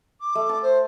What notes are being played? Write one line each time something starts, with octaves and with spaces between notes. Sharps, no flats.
D6
A3
A5
C5